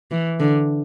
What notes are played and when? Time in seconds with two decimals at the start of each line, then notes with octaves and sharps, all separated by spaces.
0.11 E3
0.40 D3